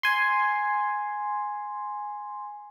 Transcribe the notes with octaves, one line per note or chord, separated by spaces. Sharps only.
G#5 C6